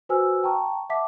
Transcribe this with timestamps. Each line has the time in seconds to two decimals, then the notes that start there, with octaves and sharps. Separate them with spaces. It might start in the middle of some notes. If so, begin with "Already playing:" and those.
0.09 F#4 B4 C5 G#5 E6 F6
0.43 G5 A5 A#5 C#6
0.90 E5 F#5 A5 D6 B6